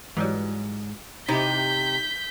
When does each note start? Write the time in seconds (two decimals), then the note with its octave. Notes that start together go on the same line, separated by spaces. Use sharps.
0.17 G#2 E3 F#3 G3
1.28 C3 C4 D#4 E4 G4 G6 B6